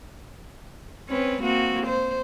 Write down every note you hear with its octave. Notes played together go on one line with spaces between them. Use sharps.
C4 C#4 B4
A#3 C4 F#4
C5